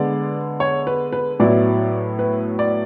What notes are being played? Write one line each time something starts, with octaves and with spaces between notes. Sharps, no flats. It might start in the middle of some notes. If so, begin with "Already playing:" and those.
Already playing: D3 G#3 B3 D5
C#5
B4
B4
A2 F#3 B3 E4 D5
B4
D5